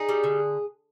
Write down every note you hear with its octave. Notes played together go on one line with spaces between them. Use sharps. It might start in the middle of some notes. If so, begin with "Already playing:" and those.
Already playing: D#4 G#4
G3
D3